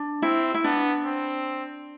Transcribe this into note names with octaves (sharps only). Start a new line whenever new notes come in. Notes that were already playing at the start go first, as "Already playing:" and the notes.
Already playing: D4
C4 E4
E4
B3 D4
C4